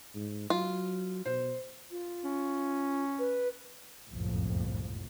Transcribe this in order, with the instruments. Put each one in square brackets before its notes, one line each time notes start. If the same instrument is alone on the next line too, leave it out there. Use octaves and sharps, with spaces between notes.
[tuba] G#2
[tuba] F#3 [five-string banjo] F4
[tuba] B2 [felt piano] C5
[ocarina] F4
[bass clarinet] C#4
[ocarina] B4
[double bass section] F#1 C2 F2 A2 F3